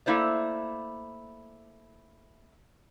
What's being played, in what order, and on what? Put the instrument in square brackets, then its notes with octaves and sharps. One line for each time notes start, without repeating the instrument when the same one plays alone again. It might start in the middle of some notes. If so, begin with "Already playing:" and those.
[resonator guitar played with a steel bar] A3 A#3 E4 C5 D5